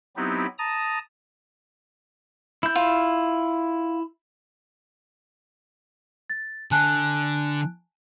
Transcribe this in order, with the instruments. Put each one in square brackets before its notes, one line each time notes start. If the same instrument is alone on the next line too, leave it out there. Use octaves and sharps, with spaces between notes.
[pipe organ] F#3 B3 C4 D#4 E4 G4
A5 A#5 D#6
[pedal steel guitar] E4 G6
[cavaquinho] F4
[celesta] A6
[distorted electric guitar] D3 [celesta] G#5 A5 F#6